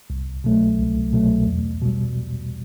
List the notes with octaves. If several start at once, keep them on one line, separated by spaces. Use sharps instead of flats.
C2
B2 F#3 A3
C2
B2 F#3 A3
E2
B2 G3